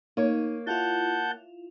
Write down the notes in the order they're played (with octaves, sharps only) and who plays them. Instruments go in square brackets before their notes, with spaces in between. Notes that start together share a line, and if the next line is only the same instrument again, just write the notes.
[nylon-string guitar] A#3 C#5 [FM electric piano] D#4
[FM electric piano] E4 F4 [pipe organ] F#5 A5 G6